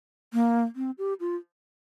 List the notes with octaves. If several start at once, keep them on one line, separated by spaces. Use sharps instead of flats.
A#3
C4
G4
F4